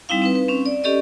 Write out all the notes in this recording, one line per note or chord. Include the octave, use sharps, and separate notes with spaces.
G3 C4 D#4 E4 F5
C4 D#4 B4
B4
C4 C#4
D5
C#4 G4 A4 D5 D#5